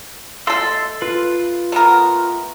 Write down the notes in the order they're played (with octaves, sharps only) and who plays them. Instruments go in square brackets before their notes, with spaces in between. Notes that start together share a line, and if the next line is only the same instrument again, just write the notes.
[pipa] A3 A4 [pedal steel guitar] D#5 C6 E6
[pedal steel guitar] F4 B4
[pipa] A3 B3 A#4